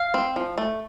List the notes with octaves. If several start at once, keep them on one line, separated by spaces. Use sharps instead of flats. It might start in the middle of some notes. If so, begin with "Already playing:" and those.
Already playing: F5
C4
F3
A3